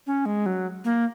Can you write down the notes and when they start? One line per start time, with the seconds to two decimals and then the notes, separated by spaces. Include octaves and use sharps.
0.07 C#4
0.26 G#3
0.46 F#3
0.84 A#3